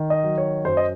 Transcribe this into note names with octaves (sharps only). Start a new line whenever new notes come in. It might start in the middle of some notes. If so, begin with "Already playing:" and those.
Already playing: D#3
D#5
F#3
C#5
F#2 C5
D#5